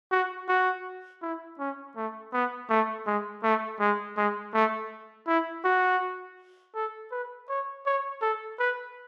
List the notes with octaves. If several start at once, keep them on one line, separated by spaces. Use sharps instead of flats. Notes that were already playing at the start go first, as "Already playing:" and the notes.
F#4
F#4
E4
C#4
A3
B3
A3
G#3
A3
G#3
G#3
A3
E4
F#4
A4
B4
C#5
C#5
A4
B4